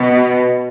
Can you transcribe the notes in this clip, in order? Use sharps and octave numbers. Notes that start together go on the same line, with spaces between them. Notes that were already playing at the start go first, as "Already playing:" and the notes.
Already playing: B2